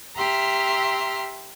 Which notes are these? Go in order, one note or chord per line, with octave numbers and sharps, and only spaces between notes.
G4 E5 A#5 C6 F6